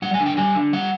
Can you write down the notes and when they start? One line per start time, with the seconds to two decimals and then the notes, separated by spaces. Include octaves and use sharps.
0.02 G3 F#5
0.14 G#5
0.20 D3
0.26 G5
0.37 G3 G#5
0.55 D3
0.73 G3 F#5